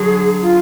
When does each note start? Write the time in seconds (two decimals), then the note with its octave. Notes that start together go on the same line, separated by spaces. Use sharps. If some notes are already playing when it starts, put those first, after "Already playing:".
Already playing: D3 F#3 G#4
0.42 F4